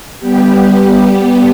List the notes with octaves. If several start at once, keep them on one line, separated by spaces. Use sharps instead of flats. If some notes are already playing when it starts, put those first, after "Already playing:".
G3 B3 G4